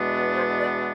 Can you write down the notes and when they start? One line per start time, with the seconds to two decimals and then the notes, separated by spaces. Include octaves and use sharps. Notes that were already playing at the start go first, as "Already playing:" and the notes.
Already playing: E2 B2 G#3 B3 D4
0.35 C5
0.58 D5